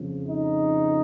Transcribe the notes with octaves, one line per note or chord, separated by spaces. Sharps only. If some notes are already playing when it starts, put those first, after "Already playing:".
Already playing: F2 C#3 F3
D#4